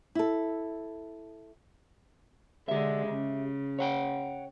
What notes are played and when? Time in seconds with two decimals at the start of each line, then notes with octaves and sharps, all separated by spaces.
0.15 E4 A4
2.68 D3 G#3 G4 E5
3.08 C#3
3.79 C#5 F#5 G5